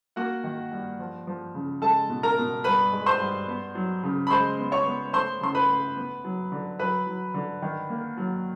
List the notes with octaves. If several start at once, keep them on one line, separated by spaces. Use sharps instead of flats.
A#3 F#4 F#5
D#3
G2
F3
F3
C#3
G#3 A4 A5
B2
A#4 A#5
B2
G2 B4 B5
G#3
C5 C6
G2
B3
F#3
C#3
B5
G#3 C5 C6
B3
C#5 C#6
B3
A3 C5 C6
C#3 C6
B4 B5
A3
B3
F#3
D3
F#3 B4 B5
F#3
D3
D#3
A#3
F#3